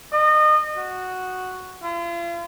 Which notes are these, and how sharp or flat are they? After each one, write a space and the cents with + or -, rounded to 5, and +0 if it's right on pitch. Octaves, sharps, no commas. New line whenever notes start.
D#5 -30
F#4 +0
F4 -40